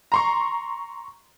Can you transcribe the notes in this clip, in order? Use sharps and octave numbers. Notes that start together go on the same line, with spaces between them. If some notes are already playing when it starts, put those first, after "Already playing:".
A#5 C6 C#6